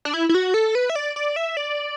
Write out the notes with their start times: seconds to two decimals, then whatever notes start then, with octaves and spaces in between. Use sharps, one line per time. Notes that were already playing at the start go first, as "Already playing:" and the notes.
0.05 D4
0.14 E4
0.29 E4
0.34 F#4
0.54 A4
0.75 B4
0.90 E5
0.96 D5
1.16 D5
1.36 E5
1.57 D5